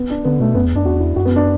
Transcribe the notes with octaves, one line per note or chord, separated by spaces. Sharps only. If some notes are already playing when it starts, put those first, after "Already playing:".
Already playing: B3
D4
D3 B3
B2 A3
F#2 B3
E2
F#2 D4
E2 F#4
E4
F#2 F#4
B3
D4